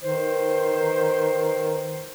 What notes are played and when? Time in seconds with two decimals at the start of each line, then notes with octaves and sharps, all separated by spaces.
0.03 D#3 D#4 B4 C5